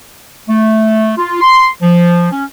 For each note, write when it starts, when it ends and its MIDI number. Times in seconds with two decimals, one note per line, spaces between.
0.48 1.13 57
1.18 1.38 65
1.41 1.67 84
1.82 2.30 53
2.31 2.44 61